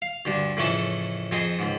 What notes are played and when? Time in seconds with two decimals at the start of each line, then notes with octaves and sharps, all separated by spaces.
0.02 F5
0.25 D2 G2 D4
0.57 F2 A2 C#3 E3 C#4 A5
1.31 F2 C4 G#4 D#5
1.59 C#2 G#2